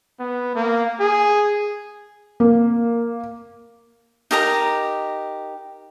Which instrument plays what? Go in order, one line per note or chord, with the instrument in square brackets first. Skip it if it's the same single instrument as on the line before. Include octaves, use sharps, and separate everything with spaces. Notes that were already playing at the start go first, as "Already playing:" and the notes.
[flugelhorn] B3
A#3
G#4
[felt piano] A#3
[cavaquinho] D#4 G4 A#4 A#5